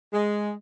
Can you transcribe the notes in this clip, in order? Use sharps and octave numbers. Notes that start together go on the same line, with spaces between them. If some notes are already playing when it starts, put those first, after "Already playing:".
G#3